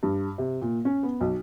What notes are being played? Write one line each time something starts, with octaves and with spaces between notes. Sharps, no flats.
G2
C3
A#2
C#4
B3
B1